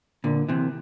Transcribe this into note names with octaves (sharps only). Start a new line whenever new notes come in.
A#2 D3
C3 E3